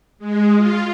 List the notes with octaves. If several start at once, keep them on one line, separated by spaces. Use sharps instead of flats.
G#3
F4